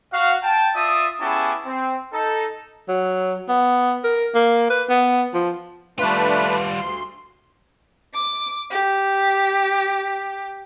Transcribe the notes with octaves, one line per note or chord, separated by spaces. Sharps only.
F#4 F5
G5 A5
F4 D5 E5 D#6
B3 C#4 E4 G4 G#4 A5
C4
D#4 A4
F#3
B3
A#4
A#3
B4
B3
F3
G3 A3 D4 F4 B4
D2 C6
D6
G4